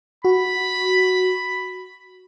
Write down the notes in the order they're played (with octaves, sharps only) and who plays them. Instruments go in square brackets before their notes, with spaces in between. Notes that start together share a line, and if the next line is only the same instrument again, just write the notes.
[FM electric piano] F#4 [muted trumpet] B5